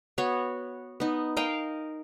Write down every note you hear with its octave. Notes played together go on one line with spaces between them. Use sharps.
B3 F#4 C#5
B3 D#4
A#4 D#5 F5 G5